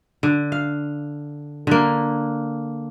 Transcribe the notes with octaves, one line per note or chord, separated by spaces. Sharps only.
D3
F5
D3 A#3